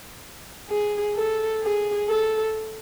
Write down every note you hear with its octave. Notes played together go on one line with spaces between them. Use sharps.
G#4
A4
G#4
A4